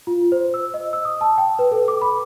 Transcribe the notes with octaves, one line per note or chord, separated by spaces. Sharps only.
F4
C5
E6
D#5
E6
D#6
A5
G5
B4
A4
D6
B5